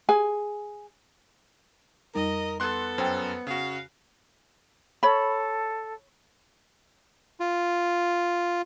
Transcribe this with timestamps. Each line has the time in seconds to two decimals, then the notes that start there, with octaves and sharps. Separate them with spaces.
0.09 G#4 G#5
2.15 F2 G3 D#4 A#4 D#5
2.60 B3 A4 C6 F#6
2.98 F#2 C5 G5
3.47 C#3 F#4 F5
5.03 A4 C#5 B5
7.40 F4